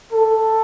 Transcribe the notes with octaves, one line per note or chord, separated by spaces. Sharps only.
A4